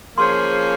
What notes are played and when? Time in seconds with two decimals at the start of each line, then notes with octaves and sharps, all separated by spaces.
0.17 F3 A#3 C#4 G#4 C5 C6